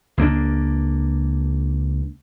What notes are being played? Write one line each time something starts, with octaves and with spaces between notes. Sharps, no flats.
C#2 A#3 D4